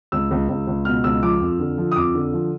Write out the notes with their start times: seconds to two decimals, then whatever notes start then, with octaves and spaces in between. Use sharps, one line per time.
0.12 C#2 E6
0.31 C#2
0.49 C#2
0.67 C#2
0.85 B2 F6
1.04 C#2 E6
1.23 F3 D6
1.41 F2
1.60 D3
1.78 F3
1.92 D#6
1.96 F2 D6
2.15 D3
2.33 F3